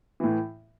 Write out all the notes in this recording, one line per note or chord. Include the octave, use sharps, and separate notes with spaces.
A2 E3